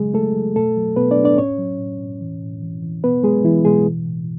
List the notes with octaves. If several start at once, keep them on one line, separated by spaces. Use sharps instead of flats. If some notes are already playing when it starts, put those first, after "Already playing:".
Already playing: C#3 F#3 G#3 G#4
F#3 A3 A4
F#3
B2 A3 A4
F#3
B2 B3 B4
D4 D5
F#3
D4 D5
A2 C#4 C#5
F#3
A2
A2
E3
A2
E3
E3
B2 B3 B4
F#3 G#3 G#4
E3 F#3 E4
B2 G#3 G#4
E3
A2